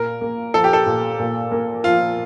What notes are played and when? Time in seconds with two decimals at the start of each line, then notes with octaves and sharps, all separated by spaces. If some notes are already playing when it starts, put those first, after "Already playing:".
Already playing: A#2 A#4
0.21 A#3
0.54 F3 A4
0.64 G4
0.73 A4
0.87 A#2
1.19 A#2
1.52 A#3
1.84 F3 F4